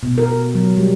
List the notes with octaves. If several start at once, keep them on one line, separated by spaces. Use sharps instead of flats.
B2
A#4
F#3
G3